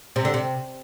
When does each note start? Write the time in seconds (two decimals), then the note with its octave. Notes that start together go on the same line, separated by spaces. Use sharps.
0.16 C3
0.25 D3
0.34 C3